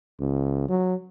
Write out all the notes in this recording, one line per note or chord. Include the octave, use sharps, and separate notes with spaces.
C#2
F#3